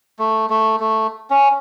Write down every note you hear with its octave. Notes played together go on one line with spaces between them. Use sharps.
A3
A3
A3
C#4